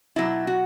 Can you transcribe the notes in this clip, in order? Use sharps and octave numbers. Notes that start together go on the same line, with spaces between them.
B2 F#3 E4
F#4